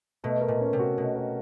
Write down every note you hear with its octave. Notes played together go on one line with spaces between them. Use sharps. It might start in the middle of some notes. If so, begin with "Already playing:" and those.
B2 A3
A#4
A#2
C#4
C3
F#4
B2 A3
A#4